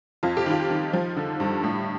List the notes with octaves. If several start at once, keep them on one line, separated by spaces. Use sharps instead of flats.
F2 F4
G4
D#3 F4
D#3
F3
D3
G2
A2